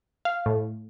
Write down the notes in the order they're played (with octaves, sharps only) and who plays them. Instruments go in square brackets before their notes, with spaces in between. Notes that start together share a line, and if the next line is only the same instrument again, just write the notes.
[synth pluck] F5
A2